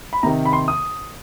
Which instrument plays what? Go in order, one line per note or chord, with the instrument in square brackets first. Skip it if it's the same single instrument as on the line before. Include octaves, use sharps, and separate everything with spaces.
[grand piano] B5
C3 D#3 A#5
B5
C6
D#6